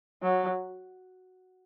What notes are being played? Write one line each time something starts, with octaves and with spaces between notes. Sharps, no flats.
F#3